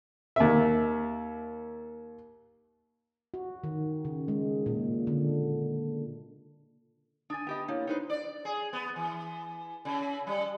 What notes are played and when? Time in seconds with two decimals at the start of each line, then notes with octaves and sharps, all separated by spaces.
0.36 D#2 E5
3.34 F#4
3.64 D#3
4.05 C#3
4.28 G#3
4.66 A#2
5.07 D3
7.30 D4 G#5 D#6 A6
7.47 B3 G4 D#5
7.68 A#3 D4 E4 C#5
7.87 D#4 B4 C5
8.10 D5
8.45 G#4
8.73 B3
8.96 E3
9.85 C#3
10.27 G3